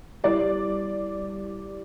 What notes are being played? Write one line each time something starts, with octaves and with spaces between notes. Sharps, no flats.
G3 E4 G4 D5